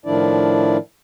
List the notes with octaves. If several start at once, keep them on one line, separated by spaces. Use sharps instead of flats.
A2 D#3 F3 D4 E4 D5